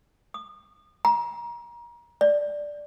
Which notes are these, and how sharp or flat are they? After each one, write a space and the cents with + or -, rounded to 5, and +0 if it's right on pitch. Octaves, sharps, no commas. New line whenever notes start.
D#6 -35
A#5 +30
D5 +0